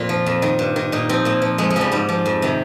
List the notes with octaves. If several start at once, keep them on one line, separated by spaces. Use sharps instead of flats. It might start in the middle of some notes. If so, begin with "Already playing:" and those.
Already playing: F2 A#2 F4
F3
F2
D#3
G2
D#3
A#2 D#4
F3 C4
A#2 A#3
F3
F2 G#3
G#3
C#3 F3 G3
G#2 G3
F3
F2
C3 D#3